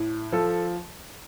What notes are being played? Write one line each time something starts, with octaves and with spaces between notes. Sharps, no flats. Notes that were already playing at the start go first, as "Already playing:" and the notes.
Already playing: A2
F3 A4